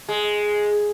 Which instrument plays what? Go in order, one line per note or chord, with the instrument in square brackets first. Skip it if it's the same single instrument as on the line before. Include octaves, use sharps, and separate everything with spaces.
[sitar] G#3